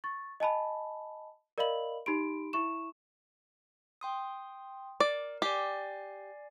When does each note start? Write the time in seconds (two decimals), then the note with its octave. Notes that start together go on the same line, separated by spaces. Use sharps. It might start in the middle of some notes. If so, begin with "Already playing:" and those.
0.04 C#6 A6
0.40 D#5 G#5 A5 B5
1.58 A#4 D5 D#5 F5 B5 F#7
2.06 D#4 G4 B5 C6 D7
2.53 E4 E5 C#6 E7
4.01 G5 C6 D#6
5.00 A#4 D5
5.42 G4 D5 G#5 C7